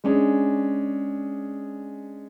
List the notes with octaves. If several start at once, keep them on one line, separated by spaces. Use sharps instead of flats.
G#3 C#4 D4 G#4